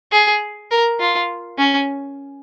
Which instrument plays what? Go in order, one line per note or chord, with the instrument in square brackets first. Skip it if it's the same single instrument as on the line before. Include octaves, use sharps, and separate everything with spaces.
[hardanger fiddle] G#4
A#4
F4
C#4